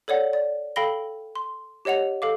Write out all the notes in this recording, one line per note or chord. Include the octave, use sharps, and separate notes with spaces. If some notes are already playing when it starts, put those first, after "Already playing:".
A4 C#5 D5 F#5
D5
A4 F5 G5 B5 A#6 G7
C6
G4 C#5 D#5 F#5 F7
A4 F5 D6